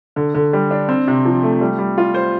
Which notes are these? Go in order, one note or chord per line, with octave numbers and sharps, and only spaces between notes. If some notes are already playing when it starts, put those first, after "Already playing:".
D3
D3
G3
D4
C4
C3
F3
A3
G3
G3
F4
C5